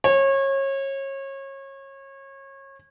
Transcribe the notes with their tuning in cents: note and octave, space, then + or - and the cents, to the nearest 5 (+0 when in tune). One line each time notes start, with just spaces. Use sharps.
C#5 -30